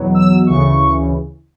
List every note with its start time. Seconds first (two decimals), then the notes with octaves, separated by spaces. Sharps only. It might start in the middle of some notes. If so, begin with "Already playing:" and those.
Already playing: E2 B2 F#3
0.14 E6
0.46 D2 C#3 E3 C#6